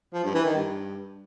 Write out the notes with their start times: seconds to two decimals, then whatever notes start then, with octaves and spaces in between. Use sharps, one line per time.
0.14 F3
0.24 G2
0.35 E3
0.45 D#3
0.56 G2